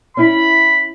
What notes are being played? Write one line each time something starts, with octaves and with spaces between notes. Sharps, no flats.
C#4 E4 B5